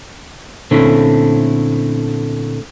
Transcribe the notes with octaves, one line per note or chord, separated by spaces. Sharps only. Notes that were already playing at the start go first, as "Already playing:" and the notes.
A#2 D3 A3 C4 C#4 E4